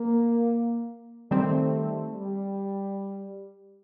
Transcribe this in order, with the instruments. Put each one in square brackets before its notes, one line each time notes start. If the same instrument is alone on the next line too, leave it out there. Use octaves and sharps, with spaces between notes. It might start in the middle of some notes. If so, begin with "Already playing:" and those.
Already playing: [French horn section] A#3
[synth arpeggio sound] D#3 G3 C4 [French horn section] A3
[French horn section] G3